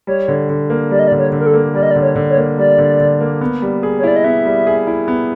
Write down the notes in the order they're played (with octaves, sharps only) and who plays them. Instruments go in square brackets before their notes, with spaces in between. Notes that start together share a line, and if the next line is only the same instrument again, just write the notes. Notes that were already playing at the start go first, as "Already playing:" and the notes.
[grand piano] G3 [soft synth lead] C#5
[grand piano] D3
D3
A#3
[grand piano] G3 [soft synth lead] D5
[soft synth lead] D#5
D5
[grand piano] D3
[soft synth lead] C#5
[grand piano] D3
[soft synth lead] A#4
A4
[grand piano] A#3
[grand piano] G3 [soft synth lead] D5
[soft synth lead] D#5
D5
[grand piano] D3
[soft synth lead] C#5
[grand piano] D3
[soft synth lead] C#5
[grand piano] A#3
[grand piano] G3 [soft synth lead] D5
[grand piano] D3
D3
A#3
B3
G3
G#4
[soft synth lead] C#5
[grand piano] E4 [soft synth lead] D5
[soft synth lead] D#5
[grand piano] B3 [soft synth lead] E5
[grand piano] G3
G#4
E4
B3